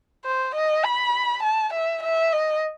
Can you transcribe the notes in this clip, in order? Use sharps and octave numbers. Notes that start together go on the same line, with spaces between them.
C5
D#5
B5
A5
E5
E5
D#5